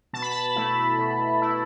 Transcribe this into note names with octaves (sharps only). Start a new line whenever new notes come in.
B2 A5
B5
A5
A3 E4
B2
A3 E4